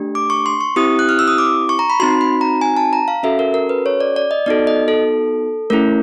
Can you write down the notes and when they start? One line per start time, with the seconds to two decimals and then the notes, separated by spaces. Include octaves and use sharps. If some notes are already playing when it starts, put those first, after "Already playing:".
Already playing: A3 D4 G4
0.15 D6
0.30 C#6
0.46 C6
0.61 C#6
0.76 C4 E4 G4 D#6
0.99 F#6
1.09 F6
1.19 E6
1.28 D#6
1.38 D6
1.69 C#6
1.79 A#5
1.90 B5
2.00 C4 D#4 F#4 C6
2.21 B5
2.41 A#5
2.61 G#5
2.77 A5
2.93 A#5
3.08 F5
3.23 C#4 F#4 A4 E5
3.39 A#4
3.54 A#4
3.69 B4
3.86 C#5
4.01 D5
4.16 D5
4.31 D#5
4.46 B3 D#4 F#4 A4 D5
4.67 D#5
4.88 A4
5.70 A3 C#4 E4 A#4